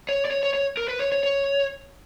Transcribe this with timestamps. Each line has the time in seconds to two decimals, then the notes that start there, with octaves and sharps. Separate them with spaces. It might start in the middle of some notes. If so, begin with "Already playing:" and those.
0.09 C#5
0.25 D5
0.31 C#5
0.43 C#5
0.54 C#5
0.77 A#4
0.88 B4
0.99 C#5
1.12 C#5
1.23 C#5